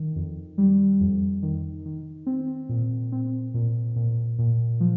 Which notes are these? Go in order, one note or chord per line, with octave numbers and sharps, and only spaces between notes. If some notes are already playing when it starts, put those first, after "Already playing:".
Already playing: D#3
F2
G3
F2
D#3
D#3
C4
A#2
C4
A#2
A#2
A#2
F3